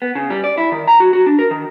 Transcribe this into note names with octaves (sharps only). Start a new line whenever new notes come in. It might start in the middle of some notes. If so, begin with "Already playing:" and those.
B3
C#3
G3
D5
E4
D#3
A#5
F#4
F#4
D4
A#4
D#3